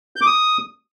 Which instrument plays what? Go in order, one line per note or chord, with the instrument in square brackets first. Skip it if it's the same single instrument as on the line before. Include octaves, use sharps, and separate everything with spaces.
[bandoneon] G6
D6
D#6